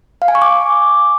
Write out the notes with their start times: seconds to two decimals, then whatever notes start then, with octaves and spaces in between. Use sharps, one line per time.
0.22 F5
0.28 G#5
0.35 C#6
0.42 D6